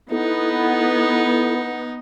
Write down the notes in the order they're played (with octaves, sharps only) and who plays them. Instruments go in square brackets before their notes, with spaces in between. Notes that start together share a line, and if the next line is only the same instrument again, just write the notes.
[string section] B3 [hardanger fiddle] D#4 [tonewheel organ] E4 A4